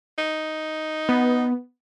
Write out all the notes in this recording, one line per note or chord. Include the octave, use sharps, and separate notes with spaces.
D#4
B3